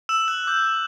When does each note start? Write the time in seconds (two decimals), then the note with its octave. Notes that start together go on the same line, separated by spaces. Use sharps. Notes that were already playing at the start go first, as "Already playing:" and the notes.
0.09 E6 E7
0.28 F#6 F#7
0.47 D6 G6